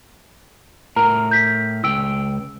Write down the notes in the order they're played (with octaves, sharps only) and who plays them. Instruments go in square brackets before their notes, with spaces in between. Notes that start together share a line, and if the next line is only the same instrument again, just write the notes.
[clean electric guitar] A2 A#4 [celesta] A#5
[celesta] G6 B6
[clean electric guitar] C#2 G5 [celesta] E6